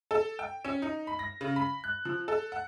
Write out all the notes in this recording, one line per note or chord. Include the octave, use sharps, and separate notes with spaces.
A4
G5
C#4
D#4
B5
A#6
C#3
B5
F#6
F3
A4
F#5